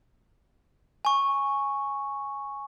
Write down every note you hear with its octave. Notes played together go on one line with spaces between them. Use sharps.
G#5 C#6